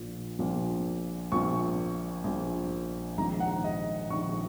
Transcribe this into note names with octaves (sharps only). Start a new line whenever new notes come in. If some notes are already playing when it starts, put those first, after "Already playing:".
Already playing: A#1 A#2
A#1 A#2
A#1 A#2 C#6
A#1 A#2
A#1 G#2 D#3 A#5
F#5
D#5
A#1 G#2 D#3 C#6